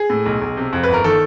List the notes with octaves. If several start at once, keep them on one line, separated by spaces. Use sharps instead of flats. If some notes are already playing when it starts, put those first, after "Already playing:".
Already playing: G#4
A2
B1
B1
C3
F2
G1 B4
A#4
D#3 A4